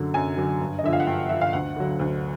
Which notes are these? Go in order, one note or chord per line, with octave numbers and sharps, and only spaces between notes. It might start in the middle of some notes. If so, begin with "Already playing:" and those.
Already playing: F#2 D3 F#3
F#2 G#5
D3 F#3
G2
D#5
D3 F3 E5
F5
F#5
G2 G5
D3 F3 E5
F5
D2 F#5
D3 F#3
D2